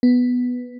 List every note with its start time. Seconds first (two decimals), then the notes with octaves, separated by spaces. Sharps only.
0.03 B3